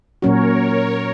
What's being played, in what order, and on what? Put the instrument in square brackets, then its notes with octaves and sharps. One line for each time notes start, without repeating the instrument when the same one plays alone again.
[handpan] A#2 F#3 C#4 F#4 [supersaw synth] A#4 C#5